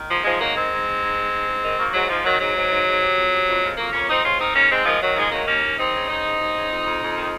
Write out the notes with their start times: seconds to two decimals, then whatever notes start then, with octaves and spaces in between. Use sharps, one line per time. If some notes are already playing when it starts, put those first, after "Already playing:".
Already playing: D#3
0.09 G#2 F3
0.24 G#2 F3 G#3
0.40 D#3 F#3 A#3
0.55 G#2 G#3 C4
0.71 G#2
0.85 G#2
1.01 G#2
1.16 G#2
1.32 G#2
1.47 G#2
1.63 D#3
1.78 D#3 F#3 A#3
1.93 G#2 F#3
2.08 G#2 F3
2.24 D#3 F#3
2.39 G#2 F#3
2.55 G#2
2.70 G#2
2.86 G#2
3.01 C3
3.16 F2
3.32 C3
3.48 F2
3.62 F2 F3 G#3
3.78 F2 F#3 A#3
3.93 F2 A#3 C#4
4.09 F2 C4 D#4
4.24 G#2 C#4 F4
4.39 D#3 C4 D#4
4.54 G#2 A#3 C#4
4.70 G#2 G#3 C4
4.85 D#3 F3 G#3
5.01 D#3 F#3
5.16 G#2 F3 G#3
5.31 D#3 F#3 A#3
5.47 D#2 A#3 C#4
5.63 D#2
5.78 D#2 C4 D#4
5.93 C#3
6.08 C#3 C4 D#4
6.24 C#3
6.39 D#2
6.55 C#3
6.70 F2
6.85 F2
7.01 F2
7.16 D#3